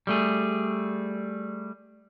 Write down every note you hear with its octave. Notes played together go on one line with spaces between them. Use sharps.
G3 A3 G#4